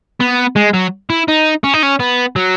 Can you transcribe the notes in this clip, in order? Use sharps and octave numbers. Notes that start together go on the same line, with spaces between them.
B3
G#3
F#3
E4
D#4
C#4
D#4
C#4
B3
F#3